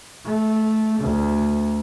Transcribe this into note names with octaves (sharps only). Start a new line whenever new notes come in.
A3
D2